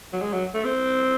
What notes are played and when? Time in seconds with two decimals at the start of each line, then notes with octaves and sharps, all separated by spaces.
0.13 F#3
0.22 G#3
0.33 F#3
0.54 A3
0.65 C4